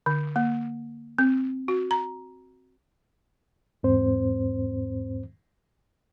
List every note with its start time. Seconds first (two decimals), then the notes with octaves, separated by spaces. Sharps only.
0.06 D3
0.36 A#3
1.19 C4
1.68 F#4
1.91 A#5
3.83 E2 G#2 C4 C5